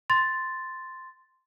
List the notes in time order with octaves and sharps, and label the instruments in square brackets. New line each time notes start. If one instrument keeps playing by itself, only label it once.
[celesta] C6 A6